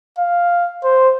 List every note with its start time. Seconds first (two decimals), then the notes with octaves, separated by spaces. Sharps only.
0.19 F5
0.84 C5